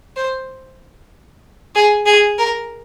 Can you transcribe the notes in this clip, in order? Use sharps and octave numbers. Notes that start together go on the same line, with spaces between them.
C5
G#4
G#4
A#4